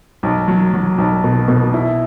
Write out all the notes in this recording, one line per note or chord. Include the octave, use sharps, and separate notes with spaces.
B1
F#3
F#3
B1
B2
B2
E4